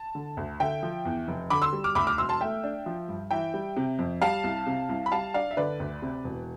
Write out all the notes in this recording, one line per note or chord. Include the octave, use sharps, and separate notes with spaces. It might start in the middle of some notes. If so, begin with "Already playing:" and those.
Already playing: A5
D3
D2
D3 E5 G5
F3
E2
F1
D3 B5 D6
C6 E6
G3
D6 F6
D2 B5 D6
D6 F6
E1 C6 E6
A5 C6
A3 E5 G5
D4
F3
G2
E3 E5 G5
G3
C3
F2
G3 F5 A5
C2
C3
C2
B5
G3 F5 A5
D4 D5 F5
E5
D3 B4 D5
D2
C3
E1